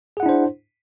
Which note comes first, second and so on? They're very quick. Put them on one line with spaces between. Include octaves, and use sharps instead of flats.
G#4 F#5 E4 D4 C5